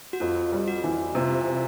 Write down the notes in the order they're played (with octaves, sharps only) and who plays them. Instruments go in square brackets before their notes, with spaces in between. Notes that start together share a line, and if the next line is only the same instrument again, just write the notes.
[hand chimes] F#4
[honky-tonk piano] F2 [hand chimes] F4
[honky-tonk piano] G3
[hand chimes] F#4
[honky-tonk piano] E3
[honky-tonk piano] C3 [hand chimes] F4